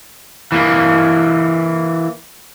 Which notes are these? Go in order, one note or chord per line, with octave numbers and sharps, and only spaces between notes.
E3 A#3